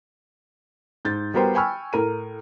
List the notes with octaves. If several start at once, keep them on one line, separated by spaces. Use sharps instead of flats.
G#2 G6 A6
G3 B3 F#4 A#4 C5 G5
G5 G#5 B5 C#6 E6 F6
A2 A#4 D#7